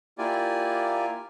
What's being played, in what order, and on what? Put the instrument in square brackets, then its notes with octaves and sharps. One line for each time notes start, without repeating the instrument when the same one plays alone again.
[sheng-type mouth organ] A#3 E4 F4 G4 D5 G#5